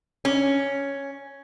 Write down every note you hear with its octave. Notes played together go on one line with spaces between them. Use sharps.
C#4